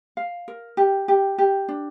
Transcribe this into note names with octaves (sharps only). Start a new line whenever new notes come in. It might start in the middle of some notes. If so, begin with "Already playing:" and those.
F5
A#4
G4
G4
G4
D4